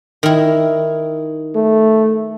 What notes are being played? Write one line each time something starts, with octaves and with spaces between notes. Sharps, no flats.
D#3 E4
A3